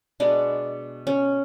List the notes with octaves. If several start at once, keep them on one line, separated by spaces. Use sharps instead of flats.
B2 G#3 B3 D4
C#4